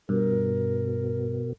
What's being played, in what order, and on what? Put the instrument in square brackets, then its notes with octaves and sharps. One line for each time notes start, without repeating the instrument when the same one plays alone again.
[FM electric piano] G2 [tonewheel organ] B2 [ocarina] A#4